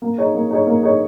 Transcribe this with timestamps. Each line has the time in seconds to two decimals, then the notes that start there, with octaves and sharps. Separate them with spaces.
0.02 A#3
0.18 D#4 G#4 C#5
0.34 A#3
0.51 D#4 G#4 C#5
0.67 A#3
0.83 D#4 G#4 C#5